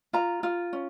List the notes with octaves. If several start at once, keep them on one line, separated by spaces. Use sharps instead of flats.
F4 A#5
F4
C#4